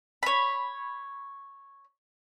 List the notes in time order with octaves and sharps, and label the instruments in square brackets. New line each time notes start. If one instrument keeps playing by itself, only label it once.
[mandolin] C#5 B5